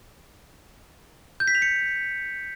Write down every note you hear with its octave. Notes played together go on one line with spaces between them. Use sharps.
G6
B6
F7
C#7